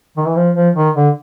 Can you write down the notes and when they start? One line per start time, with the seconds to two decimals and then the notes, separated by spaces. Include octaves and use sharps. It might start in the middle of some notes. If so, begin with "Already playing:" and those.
0.17 D#3
0.26 E3
0.36 F3
0.55 F3
0.76 D#3
0.95 D3